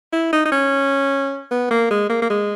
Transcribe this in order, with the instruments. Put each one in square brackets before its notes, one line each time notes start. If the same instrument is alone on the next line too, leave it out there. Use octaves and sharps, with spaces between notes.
[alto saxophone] E4
D#4
D#4
C#4
B3
A#3
G#3
A#3
A#3
G#3